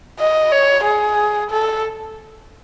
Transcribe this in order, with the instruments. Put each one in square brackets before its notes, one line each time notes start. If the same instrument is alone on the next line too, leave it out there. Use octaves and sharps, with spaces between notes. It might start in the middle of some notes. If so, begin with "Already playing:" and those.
[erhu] D#5
C#5
G#4
A4